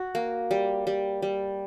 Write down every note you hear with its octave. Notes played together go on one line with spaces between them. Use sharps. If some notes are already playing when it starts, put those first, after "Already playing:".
Already playing: F#4
A#3
G3
G3
G3